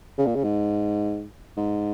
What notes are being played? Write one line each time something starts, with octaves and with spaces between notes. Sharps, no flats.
C#3
A#2
C#3
G#2
G#2